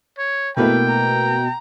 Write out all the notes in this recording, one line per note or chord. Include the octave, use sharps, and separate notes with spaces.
C#5
B2 A3 A#3 E4 B4 G5
A#5